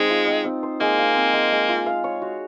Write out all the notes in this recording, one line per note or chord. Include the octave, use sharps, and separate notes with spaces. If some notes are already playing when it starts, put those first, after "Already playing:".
Already playing: G#3 C4 D#4 C5
F4
C4
C4
C5
G#3 A#3
F4
C4
G#3
G#3
F4
F5
C#5
F#4